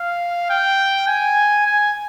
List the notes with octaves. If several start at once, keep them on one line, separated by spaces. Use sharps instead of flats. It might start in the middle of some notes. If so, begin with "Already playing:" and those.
Already playing: F5
G5
G#5
G#5